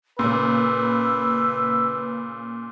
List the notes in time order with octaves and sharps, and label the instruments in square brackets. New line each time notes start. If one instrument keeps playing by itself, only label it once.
[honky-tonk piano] A#2 C#3 [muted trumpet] B4 [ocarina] E6